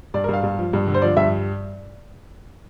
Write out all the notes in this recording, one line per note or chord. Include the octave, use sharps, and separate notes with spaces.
G2 D5
A#4
G2 F5
G2
F3
G2
D3
C5
F3 D5
G2 E5